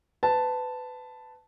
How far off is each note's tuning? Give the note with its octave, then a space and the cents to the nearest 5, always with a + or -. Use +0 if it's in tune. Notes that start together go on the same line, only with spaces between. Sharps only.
B4 +25 A5 +0